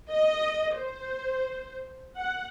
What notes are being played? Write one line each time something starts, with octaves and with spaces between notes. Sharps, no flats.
D#5
C5
F#5